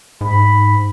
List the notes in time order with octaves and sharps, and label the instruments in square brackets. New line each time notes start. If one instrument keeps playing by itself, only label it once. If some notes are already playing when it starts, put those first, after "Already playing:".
[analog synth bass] G#2 [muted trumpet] B5